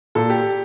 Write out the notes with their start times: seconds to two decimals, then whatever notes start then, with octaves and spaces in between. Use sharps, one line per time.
0.15 A#2 A4
0.30 G4